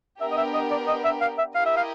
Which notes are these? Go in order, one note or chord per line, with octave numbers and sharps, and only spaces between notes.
B3 D4 G4 A#4 E5
D#5
E5
D#5
D5
D#5
E5
F5
E5
E4 G4 A#4 D#5 F5
E5
F5